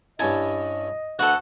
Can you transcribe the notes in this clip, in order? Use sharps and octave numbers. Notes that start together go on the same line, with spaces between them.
G2 C#4 E4 D#5 G#5 A5
D2 F#4 A4 B4 F#5